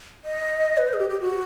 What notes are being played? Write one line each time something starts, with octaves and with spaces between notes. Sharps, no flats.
D#5
B4
C5
G#4
G4
G4
F#4